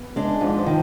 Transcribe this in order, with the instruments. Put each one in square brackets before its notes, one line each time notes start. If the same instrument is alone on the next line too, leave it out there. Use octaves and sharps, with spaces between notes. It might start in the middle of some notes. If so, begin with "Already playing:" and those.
Already playing: [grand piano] B3
[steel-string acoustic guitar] G#3 D4
[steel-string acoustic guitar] G#2 [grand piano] F3
[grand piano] F3
[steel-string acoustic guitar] D#3